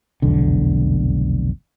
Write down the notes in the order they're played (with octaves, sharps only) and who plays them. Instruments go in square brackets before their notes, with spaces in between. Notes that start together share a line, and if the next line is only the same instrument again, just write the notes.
[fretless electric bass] F1 B1 E2 D3